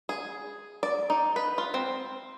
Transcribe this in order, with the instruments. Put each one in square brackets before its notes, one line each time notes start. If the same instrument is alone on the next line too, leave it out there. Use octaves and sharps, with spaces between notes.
[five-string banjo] G#4
D5
D#4
B4
F4
C4